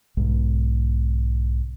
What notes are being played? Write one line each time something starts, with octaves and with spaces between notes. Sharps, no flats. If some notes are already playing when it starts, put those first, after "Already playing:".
B1 G#2